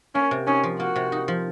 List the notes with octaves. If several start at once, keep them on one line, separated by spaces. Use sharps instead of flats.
A#3 C#4
C3
C#4 D#4
F3
A#3 F#4
C3
D#4
F3